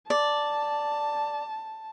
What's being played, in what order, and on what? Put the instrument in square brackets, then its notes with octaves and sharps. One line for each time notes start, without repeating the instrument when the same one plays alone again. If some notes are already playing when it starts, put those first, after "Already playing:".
[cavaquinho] D5 [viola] A5